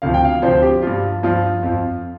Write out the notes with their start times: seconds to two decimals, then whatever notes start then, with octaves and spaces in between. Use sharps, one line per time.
0.02 D2 C3 F3 F5
0.14 G5
0.25 F5
0.42 D2 C3 F3 C5
0.62 G4
0.82 G2 F3 F4
1.23 G2 F3 F4
1.63 F2 F3